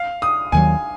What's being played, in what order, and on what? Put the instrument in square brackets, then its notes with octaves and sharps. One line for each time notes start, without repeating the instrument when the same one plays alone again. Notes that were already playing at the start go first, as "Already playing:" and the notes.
Already playing: [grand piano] F5
D#6
[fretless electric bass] D#2 D#3 F#3 [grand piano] G#5